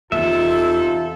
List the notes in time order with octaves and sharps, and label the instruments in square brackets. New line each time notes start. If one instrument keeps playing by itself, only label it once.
[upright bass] E2 [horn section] C3 D#4 A4 [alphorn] F4 [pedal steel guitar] E5